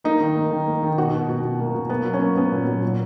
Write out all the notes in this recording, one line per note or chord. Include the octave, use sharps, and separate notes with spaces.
A#3 D#4
D#3
A#3
D#3
A#3
D#3
B2 F#4
B2
B2
B2
A#3
B2
A#3 B3
F#3
C#4
A#3
A#3 B3
A#2
F#3
A#2